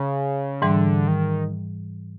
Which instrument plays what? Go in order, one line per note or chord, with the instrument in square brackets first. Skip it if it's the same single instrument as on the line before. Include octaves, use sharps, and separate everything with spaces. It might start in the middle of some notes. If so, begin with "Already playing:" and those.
Already playing: [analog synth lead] C#3
[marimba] G#2 E3 G3 [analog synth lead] D3
[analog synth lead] D#3